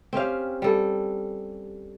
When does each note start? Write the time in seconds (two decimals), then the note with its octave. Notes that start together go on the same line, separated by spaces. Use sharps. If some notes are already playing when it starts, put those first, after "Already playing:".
0.13 C4 C#4 G4 F5
0.62 G3 A4